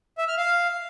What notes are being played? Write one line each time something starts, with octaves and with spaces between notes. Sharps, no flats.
E5
F6
F5